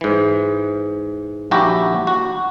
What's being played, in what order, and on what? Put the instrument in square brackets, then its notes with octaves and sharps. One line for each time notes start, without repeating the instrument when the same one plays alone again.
[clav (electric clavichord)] G#2 E3
A#1 D#2 E4 F#4 G4 A#5
F#4